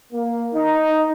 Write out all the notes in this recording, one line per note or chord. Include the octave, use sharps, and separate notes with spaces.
A#3
D#4